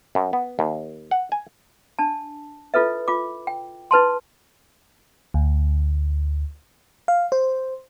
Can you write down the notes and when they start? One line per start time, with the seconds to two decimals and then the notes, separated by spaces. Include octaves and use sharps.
0.15 F#2
0.33 B3
0.59 D#2
1.11 F#5
1.32 G#5
1.99 D4 A5
2.74 E4 F4 A4 B4 E5
3.08 F4 D6
3.47 G5
3.91 E4 B4 A5 C6
5.34 D2
7.08 F5
7.32 C5